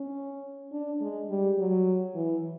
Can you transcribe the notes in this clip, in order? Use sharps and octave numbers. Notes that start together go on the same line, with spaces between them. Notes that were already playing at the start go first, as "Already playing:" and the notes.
Already playing: C#4
D4
G#3
G3
F#3
E3